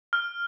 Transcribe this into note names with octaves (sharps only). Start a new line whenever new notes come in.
F6